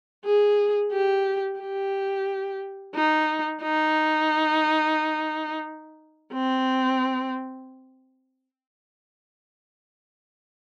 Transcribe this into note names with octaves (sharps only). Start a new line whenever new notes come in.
G#4
G4
G4
D#4
D#4
C4